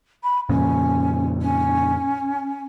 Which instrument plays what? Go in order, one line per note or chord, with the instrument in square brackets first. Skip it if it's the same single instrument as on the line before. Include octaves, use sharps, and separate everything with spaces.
[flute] B5
[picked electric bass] F2 A#2 C#3 [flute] C#4
[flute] C#4